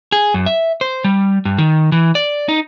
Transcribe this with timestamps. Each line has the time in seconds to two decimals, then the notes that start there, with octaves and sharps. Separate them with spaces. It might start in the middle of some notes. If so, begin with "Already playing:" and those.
0.12 G#4
0.34 F#2
0.46 E5
0.81 C5
1.04 G3
1.45 G2
1.58 D#3
1.92 E3
2.15 D5
2.49 D#4